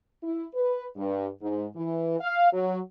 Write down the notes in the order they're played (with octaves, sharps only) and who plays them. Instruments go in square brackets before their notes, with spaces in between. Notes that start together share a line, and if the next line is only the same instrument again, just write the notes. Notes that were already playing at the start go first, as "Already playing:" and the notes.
[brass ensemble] E4
B4
G2
G#2
E3
F5
F#3